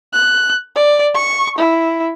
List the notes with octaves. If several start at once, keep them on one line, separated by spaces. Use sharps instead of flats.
F#6
D5
C#6
E4